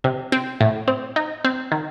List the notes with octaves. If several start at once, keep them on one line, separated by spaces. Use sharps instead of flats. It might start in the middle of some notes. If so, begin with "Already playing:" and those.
C3
C4
A2
C4
D#4
C4
D#3